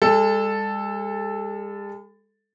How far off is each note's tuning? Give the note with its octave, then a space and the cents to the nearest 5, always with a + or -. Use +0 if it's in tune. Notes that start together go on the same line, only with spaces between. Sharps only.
G#3 -45 A4 +0